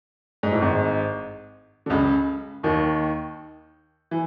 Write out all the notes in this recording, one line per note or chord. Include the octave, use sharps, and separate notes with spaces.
G#2
A2
G#1 G#2
D3
C#2 C#3
D#2 D#3
E3